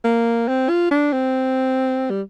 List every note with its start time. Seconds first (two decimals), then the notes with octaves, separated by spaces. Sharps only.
0.04 A#3
0.48 C4
0.69 F4
0.91 D4
1.12 C4
2.10 G3